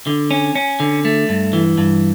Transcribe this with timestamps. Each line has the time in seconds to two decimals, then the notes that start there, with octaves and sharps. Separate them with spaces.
0.07 D3
0.31 C#4
0.55 C#4
0.80 D3
1.05 A3
1.29 G2
1.53 E3
1.78 G2